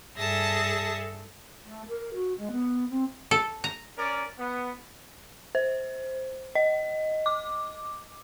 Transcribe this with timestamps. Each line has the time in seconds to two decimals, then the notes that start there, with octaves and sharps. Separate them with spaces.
0.18 G2 G#4 A4 E5 A5 A#6
1.64 A3
1.88 A#4
2.14 F#4
2.37 G#3
2.51 B3
2.90 C4
3.31 A4
3.64 A#5
3.97 C#4 A#4 D5
4.39 B3
5.55 C5
6.55 D#5
7.26 D6